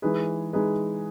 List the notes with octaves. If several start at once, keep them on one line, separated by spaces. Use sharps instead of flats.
E3 G#3 D#4 G#4 B4
E3 G#3 D#4 G#4 B4